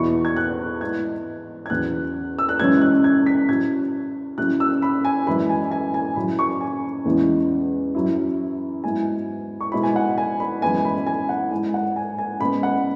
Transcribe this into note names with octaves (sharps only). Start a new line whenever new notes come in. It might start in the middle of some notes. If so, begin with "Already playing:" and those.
Already playing: E2 B2 B3 E4 C#6
G#6
F#6
G#2 G#3 B3 E4 G#6
G#6
E2 C#3 F#3 F#6
E6
F#6
F#2 C#3 E3 G#3 C#4 G#6
F#6
G#6
B6
C#3 F#3 E4 G#6
C#3 F#3 E4 F#6
E6
B5
G#5
F#2 E3 G#3 E4 B5
G#5
G#5
G#5
F#2 C#3 F#3 E4 B5
C#6
G#5
E2 C#3 E3 G#3 B3
F#2 F#3 E4
G#2 F#3 B3 E4 G#5
C#6
B2 G#3 E4 B5
G#5
F#5
G#5
B5
F#2 E3 G#3 B3 E4 G#5
B5
G#5
F#5
G#2 G#3 E4 G#5
F#5
G#5
G#5
C#3 G#3 B3 B5
F#5